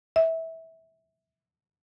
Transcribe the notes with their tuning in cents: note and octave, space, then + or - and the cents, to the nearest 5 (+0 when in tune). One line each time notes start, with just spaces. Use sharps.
E5 -20